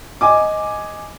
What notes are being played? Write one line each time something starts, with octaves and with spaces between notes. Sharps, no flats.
D#5 G#5 D6